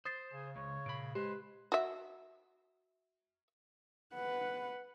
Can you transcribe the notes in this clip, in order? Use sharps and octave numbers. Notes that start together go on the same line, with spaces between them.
C5 D#6 A6 C7
C#3 G#4
C#2 C#5
A#2 B5 D7
G#3 G4 B4 C5
F#4 E5
B4 F#5